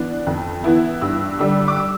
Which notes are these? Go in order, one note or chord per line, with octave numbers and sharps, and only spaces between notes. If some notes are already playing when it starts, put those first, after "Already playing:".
Already playing: E3 B3 D4
F2
E3 B3 E4
G2 E6
D3 G3 E6
D6
E6